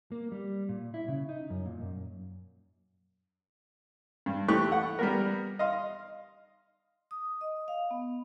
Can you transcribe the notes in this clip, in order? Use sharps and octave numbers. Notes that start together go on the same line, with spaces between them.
A#3
G3
A#2
E4
C#3
D#4
F#2
A#2
F#2
G2
E3 A3 G4 C#6 F#6
A4 F#5
G3 B3 A#4
D#5 F5 C6
D#6
D#5
F5
B3